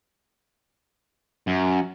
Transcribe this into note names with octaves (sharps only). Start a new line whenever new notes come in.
F#2